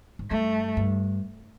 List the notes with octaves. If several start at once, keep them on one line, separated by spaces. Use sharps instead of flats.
G#2
G2 A3
G2